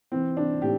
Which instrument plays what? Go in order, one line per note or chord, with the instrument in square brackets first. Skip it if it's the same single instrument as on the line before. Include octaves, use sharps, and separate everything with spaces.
[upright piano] E3 C4
E3 D4
A2 G4